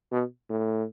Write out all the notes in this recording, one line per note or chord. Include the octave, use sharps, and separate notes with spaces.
B2
A2